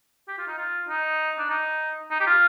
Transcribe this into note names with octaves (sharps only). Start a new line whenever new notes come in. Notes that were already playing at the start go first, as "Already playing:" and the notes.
G4
F4
D#4
F4
D#4
D4
D#4
D#4
G4
F4